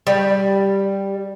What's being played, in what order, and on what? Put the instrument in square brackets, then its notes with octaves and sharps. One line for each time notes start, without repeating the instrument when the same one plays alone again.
[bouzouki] G3